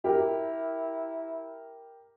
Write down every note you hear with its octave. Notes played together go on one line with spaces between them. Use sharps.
E4 G4 A#4